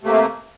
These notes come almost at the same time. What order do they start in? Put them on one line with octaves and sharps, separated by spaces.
C3 A3 A#3